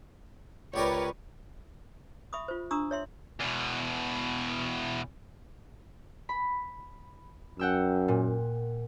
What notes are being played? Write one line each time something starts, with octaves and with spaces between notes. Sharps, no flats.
C#2 G4 A#4 B4 C#5 D5
E5 B5 C#6 D#6
F4 C5
D4 A#5 C#6 D#6 E6
C#5 E5 C6
E2 B2
B5
F#2 F#5 G5 E6
A#2